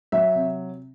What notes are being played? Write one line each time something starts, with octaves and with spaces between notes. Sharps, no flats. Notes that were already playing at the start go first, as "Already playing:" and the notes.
F#3 E5
C3